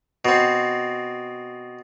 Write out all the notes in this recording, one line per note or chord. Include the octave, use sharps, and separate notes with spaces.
B2 C4